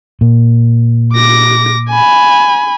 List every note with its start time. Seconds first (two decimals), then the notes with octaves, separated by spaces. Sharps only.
0.21 A#2
1.14 D6 A#6
1.90 G#5 B5